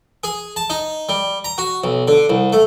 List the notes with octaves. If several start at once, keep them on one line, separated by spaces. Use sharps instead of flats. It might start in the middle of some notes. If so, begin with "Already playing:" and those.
G#4
A5
D#4
G3
A#5
F#4
B1
D3
C2
A3